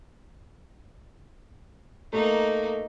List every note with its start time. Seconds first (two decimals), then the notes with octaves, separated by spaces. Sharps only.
2.13 A3 A#3 D#4